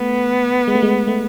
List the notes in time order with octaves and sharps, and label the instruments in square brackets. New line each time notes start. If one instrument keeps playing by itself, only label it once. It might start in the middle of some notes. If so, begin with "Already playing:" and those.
Already playing: [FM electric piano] A3 [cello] B3
[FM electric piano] G#3
A3
G#3
A3